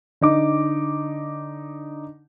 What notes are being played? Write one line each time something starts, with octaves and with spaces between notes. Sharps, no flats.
D3 D#4 D6